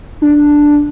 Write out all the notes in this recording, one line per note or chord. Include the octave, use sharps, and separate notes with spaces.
D4